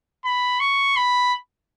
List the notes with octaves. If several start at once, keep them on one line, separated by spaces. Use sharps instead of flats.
B5
C#6
B5